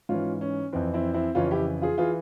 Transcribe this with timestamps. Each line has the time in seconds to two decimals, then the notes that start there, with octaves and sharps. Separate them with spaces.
0.09 G#2 E3 C#4 F4
0.41 C#4
0.73 F2 E3 C4
0.94 C4 E4
1.14 C4 E4
1.35 F2 C#3 E3 C#4 F4
1.51 E4 G4
1.82 F4 G#4
1.98 E3 F4 G#4